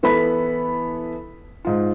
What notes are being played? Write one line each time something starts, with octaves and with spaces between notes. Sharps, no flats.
E3 B3 E4 A4 B5 B6
G#2 F4